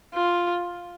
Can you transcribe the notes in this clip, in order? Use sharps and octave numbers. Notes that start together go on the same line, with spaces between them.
F4